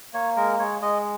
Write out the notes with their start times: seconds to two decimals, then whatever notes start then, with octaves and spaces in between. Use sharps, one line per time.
0.14 A#3 C#5
0.37 G#3 A#4
0.59 G#3 C#5
0.81 G#3 D#5